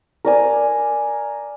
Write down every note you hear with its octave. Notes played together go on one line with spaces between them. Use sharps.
A#4 D5 G#5